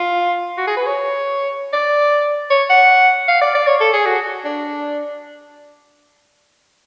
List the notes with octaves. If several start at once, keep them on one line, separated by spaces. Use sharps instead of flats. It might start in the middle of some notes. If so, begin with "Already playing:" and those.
Already playing: F4
F#4
G#4
B4
C#5
D5
C#5
F#5
F5
D5
D5
C#5
A4
G#4
F#4
D4